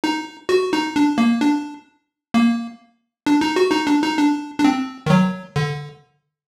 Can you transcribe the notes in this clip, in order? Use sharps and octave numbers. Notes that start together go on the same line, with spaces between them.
D#4
F#4
D#4
D4
A#3
D4
A#3
D4
D#4
F#4
D#4
D4
D#4
D4
D4
C4
D#3
F#3
D3